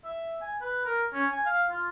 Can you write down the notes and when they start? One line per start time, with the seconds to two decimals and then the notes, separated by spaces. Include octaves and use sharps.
0.04 E5
0.42 G#5
0.61 B4
0.85 A#4
1.13 C#4
1.32 G#5
1.46 F5
1.70 F4